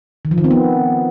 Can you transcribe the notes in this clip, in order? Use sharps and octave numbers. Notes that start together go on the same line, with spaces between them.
D#3
F3
D#3
C4
B3